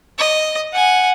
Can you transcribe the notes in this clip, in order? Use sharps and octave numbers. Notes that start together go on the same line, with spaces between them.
D#5
F#5 G#5